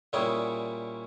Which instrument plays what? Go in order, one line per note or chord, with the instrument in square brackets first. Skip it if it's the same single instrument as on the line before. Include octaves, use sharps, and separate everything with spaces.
[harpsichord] A#2 G3 C#4 E4 G#4 G5